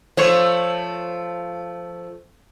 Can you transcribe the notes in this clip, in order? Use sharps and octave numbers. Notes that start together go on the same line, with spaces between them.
F3 A3 C5 C#5